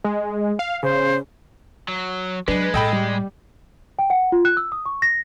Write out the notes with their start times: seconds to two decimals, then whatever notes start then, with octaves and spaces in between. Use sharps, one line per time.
0.05 G#3
0.59 F5
0.83 C#3 C5
1.88 F#3
2.48 F#3 G#3 D4 B4
2.74 A2 A#3 A4 D#5 G5 B5
2.93 G3
3.99 G5
4.10 F#5
4.32 F4
4.45 F#6
4.57 E6
4.72 D#6
4.86 C#6
5.02 A#6